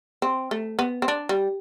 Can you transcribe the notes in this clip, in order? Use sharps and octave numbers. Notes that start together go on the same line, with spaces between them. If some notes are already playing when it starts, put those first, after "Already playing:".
C4
A3
B3
C4
D4
G3